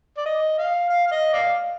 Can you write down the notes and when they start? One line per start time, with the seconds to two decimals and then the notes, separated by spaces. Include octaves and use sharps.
0.18 D5
0.26 D#5
0.58 F5
0.90 F5
1.07 F5
1.11 D#5
1.33 D5 F5